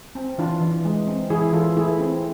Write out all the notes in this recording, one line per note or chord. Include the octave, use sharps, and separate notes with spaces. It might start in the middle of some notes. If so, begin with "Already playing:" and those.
C4
E3 D4 F4
E3
G#3
C4
E3 E4 G#4
E3 F4 A4
A3 E4 G#4
C4